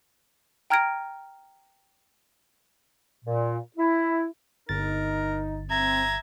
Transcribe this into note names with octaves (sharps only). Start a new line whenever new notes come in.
G5 A#5 F6 G#6 A#6 D7
A#2
E4
G1 D#4 A#4 A6
C4 E5 A#5 G#6